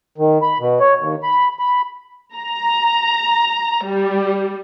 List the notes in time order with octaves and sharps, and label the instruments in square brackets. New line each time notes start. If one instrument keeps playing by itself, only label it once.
[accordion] D#3
B5
B2
C#5
D#2
B5
B5
[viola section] A#5
G3